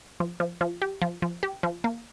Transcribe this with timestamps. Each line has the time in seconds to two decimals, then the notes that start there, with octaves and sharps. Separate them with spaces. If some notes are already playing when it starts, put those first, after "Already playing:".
0.20 F3
0.40 F3
0.61 F3
0.82 G4
1.02 F3
1.22 F3
1.43 G4
1.63 F3
1.84 A#3